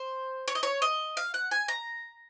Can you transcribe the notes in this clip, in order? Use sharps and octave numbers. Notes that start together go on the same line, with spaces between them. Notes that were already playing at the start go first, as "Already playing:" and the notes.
Already playing: C5
C#5
D#5
C#5
D#5
F5
F#5
G#5
A#5